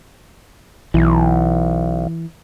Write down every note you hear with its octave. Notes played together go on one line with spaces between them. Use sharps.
B1 E3